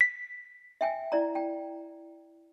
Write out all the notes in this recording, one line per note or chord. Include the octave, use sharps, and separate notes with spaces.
B6
E5 G5 G#5
E4 D5 A#5
G5